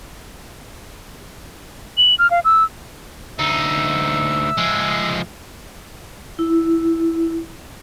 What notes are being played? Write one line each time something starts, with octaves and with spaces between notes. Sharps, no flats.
F#7
F6
F5
E6
D2 D#4 E5
F3 G#3
E4